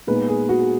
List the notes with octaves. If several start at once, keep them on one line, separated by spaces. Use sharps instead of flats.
A#2 G#3 B3 D#4 B4
G#4
F#4